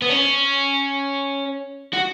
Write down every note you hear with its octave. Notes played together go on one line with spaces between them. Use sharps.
B3
C#4
F#4